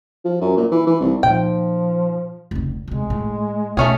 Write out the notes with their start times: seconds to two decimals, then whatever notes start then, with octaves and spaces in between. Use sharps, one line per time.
0.25 F3
0.41 F#2
0.57 A#2
0.71 E3
0.87 E3
1.01 C2
1.23 A#2 F3 D#4 G5
2.51 F1 C#2
2.88 D2 C3 G#3
3.10 A2
3.77 B2 A3 C#4 F4 G#4